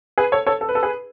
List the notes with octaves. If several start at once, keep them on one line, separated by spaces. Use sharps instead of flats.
G#4 B4
A4 C#5
A4 C#5
A4
B4
A4
G#4 B4